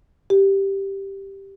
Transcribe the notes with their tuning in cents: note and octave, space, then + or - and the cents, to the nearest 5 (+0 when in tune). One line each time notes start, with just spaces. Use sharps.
G4 +0